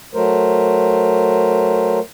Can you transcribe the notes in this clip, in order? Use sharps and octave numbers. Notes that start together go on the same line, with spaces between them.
F#3 A3 A#4 C5